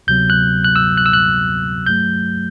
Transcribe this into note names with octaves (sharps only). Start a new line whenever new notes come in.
D2 C3 F#3 B3 G6
F#6
F#6
E6
F#6
E6
F#6
G2 F#3 A3 G6